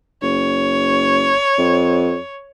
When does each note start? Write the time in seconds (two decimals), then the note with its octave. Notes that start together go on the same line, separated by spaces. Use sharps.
0.23 F#1 C#5
1.59 F2